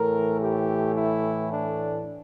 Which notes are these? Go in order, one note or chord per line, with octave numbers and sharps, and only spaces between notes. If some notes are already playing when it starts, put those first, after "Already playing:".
Already playing: A2 E3 A3 A#4
G4
E4
D4